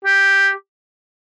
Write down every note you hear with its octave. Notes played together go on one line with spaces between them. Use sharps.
G4